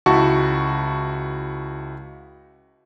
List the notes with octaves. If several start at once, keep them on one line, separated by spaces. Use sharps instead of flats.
C#2 E4 F#4 A5 C#6